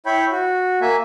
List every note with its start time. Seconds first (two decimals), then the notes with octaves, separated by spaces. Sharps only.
0.06 E4 C#5 G5 B5
0.31 F#4
0.82 A#3 E5 G#5